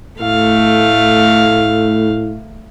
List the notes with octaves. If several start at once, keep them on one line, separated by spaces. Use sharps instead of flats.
A2 A3 F5